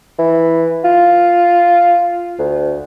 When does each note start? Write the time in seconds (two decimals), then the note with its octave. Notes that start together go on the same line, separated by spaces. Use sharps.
0.19 E3
0.85 F4
2.39 D2